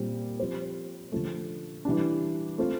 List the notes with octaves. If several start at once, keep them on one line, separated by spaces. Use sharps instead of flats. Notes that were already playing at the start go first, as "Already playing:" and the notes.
Already playing: A#2 G3 C4
F3 C4 G4 C5
D3 F3 A3
E3 G3 D4
A3 C4 F4